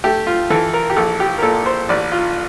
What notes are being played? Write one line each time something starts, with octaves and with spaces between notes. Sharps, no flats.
A3 G4
F4
E3 A4
A#4
G4
A#1 A4
G4
A#4
A#2 A4
C5
A1 D5
F4